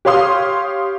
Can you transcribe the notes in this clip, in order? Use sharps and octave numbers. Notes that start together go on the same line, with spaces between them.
G4 C#5 F5 C6 D#6